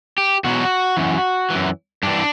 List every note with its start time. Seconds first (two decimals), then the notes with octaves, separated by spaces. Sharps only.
0.18 G4
0.44 E2 B2 F#3 F#4
0.97 F#2 E3
1.50 E3
1.55 F#2
2.03 G2 E3 D4